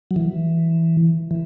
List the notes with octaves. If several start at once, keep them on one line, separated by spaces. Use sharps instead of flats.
F#3
E3
E3